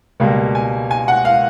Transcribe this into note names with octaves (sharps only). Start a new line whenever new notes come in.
C#2 B2 G3 A#3
G#5
G#5
F#5
F5